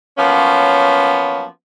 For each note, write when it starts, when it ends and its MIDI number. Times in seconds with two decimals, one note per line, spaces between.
0.17 1.44 53
0.17 1.44 54
0.17 1.44 58
0.17 1.44 59
0.17 1.44 61